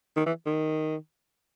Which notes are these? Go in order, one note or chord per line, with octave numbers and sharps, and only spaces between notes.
D#3
E3
D#3